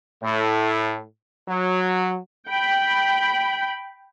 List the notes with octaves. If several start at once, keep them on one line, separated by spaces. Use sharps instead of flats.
A2
F#3
G5 B5